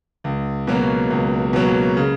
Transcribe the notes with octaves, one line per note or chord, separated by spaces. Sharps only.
C#2
B2 F#3 A#3
C#2
B2 F#3 A#3
C#3